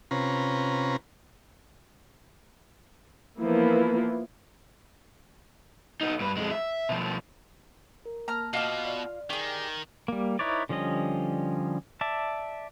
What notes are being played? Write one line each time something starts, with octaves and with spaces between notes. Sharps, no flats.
C3 C#4 F4 B4 A#5
E3 F3 A#3 B3 E4
B3 D#4
G2 B4
F2 G#3
E5
B2 F3
A#4
A#3 A5 A#5 F6
B2 F4 D#5 F5 D6
D5
D#3 G4 G#4
G3 A#3
D#4 E4 B4 C#5 D5
D3 F3 G3 C#4 D#5
D5 E5 A5